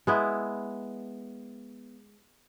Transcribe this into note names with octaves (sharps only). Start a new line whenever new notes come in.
G#3 B3 E4